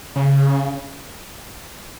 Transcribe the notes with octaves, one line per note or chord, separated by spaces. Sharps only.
C#3